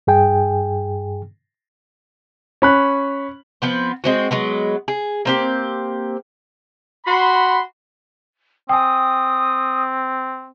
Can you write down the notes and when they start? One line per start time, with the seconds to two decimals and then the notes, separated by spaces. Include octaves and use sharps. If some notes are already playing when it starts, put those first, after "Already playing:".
0.07 G2 G#4 G5 G#5
2.62 C#4 B5 F#6
3.62 F3 B3 C4
4.04 G#3 C4 F#4
4.31 F#3 G#3 B3
4.88 G#4
5.25 A#3 C4 G4
7.06 F#4 B5 C6
8.69 C4 G5 G#5 D#6